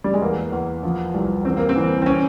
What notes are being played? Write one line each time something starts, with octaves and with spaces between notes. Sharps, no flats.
G3
G#3
E2 A#3
E2
F3
C2
E2 C4
A#3
C4
E3
C4
C#4